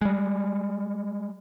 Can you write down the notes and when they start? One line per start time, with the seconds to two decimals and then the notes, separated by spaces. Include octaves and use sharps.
0.01 G3 G#3